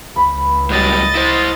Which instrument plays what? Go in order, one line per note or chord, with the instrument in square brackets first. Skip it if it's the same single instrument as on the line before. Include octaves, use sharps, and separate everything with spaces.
[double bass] C#2 [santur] B5
[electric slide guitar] A2 F#3 G3 [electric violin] D#5 A6
[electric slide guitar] E4 C5